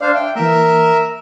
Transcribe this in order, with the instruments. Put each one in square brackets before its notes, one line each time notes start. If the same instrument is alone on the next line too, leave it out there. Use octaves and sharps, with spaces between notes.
[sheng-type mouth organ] D4 C5 F5 [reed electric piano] D5
[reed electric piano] E5 [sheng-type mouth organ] G5
[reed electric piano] E3 A#3 [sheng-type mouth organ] A#4 E5